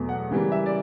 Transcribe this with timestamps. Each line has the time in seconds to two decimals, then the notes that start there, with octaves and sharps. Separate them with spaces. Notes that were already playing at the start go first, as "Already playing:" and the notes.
Already playing: E2 B2 F#3 A3
0.09 F#5
0.31 C#3 E3 G3 A#3
0.52 E5
0.66 D5